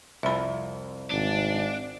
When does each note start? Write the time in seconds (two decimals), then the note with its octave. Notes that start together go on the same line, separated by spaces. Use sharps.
0.23 C2 F2 E5 B5
1.11 G#1 D4